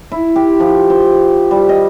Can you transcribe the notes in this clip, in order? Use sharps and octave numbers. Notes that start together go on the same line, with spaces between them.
E4
G4
F3
C5
G3
D#5